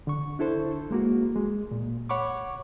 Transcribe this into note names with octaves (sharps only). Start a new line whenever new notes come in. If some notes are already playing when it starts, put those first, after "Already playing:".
D3 C#6
D4 E4 A4 C5
G#3 A#3 F#4
G#3
A#2
C#5 F#5 B5 C#6 D6